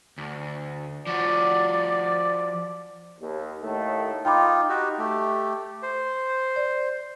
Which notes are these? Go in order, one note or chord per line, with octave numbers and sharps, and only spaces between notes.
D2
F3 F#4 D5
D#2
D#2 A2 A3 D#4 A4
D#4 F4 G5 B5 D6
D#4 F#4 G4
A3 G4
C5
D5